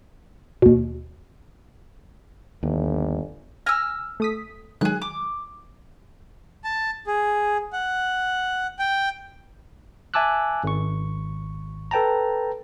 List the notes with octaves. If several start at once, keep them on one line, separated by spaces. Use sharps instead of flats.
D#2 B2
G1 D#2
G#5 E6 F6 A#6
A3 D#6 B6
D#3 F#3 G#3 G#4 F#6
D6
A5
G#4
F#5
G5
E5 G#5 A5 D6 E6 F#6
G#1 C#6
A4 B4 G5 A5 A#5